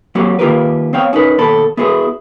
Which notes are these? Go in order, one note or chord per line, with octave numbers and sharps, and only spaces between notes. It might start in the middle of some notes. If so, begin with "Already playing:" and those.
F#3 A#3 C4 F#4 G4
D#3 A#3 F4 G4 A#4 B4
B3 C4 C5 C#5 F5 G5
C#4 D#4 A#4 B4
D#2 B2 A4 B5
B3 E4 F#4 G#4 B4